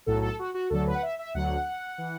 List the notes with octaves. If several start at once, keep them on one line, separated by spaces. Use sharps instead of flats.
B1 A2 F#3 A4
A4
F#4
F#4
D2 D3 F#3 A4
B4
F#5
E5
E5
D2 D3 F#3 F#5
E3